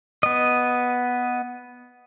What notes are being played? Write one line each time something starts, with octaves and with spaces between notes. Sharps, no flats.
B3 D#5